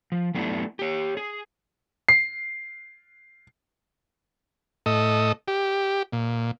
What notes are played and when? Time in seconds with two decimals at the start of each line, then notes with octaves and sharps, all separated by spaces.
0.12 F3
0.34 F#3 A3 B3 D4 E4
0.79 G4 C#5
1.17 G#4
2.09 C7
4.86 A2 A4 D#5
5.48 G4
6.12 A#2